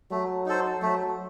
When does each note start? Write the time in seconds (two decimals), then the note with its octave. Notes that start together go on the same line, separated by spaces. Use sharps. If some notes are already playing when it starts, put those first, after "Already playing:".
0.11 F#3 A3
0.46 D#4 A4 C5
0.82 F#3 A3